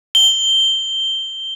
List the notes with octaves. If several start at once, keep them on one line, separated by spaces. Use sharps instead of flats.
G7